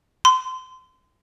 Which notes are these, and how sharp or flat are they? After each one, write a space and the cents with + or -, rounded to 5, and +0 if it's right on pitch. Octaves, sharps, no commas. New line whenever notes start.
C6 -25